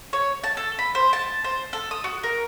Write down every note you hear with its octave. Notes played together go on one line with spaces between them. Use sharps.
C#5
A5
A4
B5
C5
A5
C5
A4
D#6
F#4
A#4